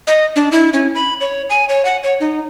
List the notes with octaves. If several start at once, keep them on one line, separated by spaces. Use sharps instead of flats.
D#5
D4
E4
C#4
B5
C#5
G#5
C#5
F#5
C#5
D#4